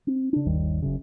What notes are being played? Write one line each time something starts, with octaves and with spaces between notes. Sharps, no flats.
C4
C#3 D4
G1 D#2 D#3 G3
F#1 F#2 C#3